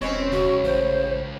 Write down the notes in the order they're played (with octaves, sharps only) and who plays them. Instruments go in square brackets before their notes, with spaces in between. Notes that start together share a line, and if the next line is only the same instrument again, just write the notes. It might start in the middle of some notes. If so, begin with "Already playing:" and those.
[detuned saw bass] E1 [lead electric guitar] C4 [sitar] C#4 B4 C#5 [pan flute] D#5
[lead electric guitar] C#2 [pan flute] F#4
[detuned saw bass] A1 [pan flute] C5